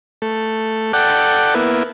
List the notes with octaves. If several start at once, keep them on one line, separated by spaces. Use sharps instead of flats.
A3
A4 D5 F#5 G5
A#3 B3 E4